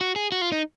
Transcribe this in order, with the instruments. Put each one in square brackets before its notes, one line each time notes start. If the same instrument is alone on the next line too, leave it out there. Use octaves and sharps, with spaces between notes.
[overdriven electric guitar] F#4
G#4
F#4
F4
D#4